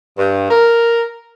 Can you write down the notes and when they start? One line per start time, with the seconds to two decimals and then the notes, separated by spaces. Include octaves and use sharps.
0.18 G2
0.51 A#4